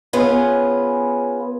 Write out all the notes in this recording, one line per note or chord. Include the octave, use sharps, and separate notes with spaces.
B3 C#4 F4 G#4 B4